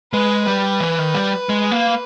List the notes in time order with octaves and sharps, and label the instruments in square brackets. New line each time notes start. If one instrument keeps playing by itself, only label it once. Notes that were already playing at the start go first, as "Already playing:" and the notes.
[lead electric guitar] G#3 [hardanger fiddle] B4
[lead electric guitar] G3 [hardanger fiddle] B4
[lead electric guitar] E3
D#3
G3
G#3
A#3